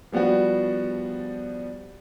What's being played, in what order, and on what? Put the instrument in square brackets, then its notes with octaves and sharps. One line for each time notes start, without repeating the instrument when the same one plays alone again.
[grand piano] F3 G3 B3 D4 F#4